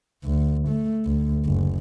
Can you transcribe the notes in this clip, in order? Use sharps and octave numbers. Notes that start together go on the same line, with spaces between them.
D2
A3
D2
F#1